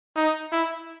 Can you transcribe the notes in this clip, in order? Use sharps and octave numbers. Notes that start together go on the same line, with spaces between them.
D#4
E4